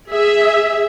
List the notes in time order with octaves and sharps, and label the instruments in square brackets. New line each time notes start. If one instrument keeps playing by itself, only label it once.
[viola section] G#4 E5